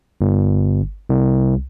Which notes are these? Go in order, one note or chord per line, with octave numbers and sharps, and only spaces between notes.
G1
C2